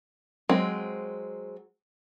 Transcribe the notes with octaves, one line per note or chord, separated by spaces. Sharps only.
F#3 G#3 C4